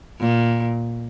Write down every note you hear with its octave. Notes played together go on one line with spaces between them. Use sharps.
A#2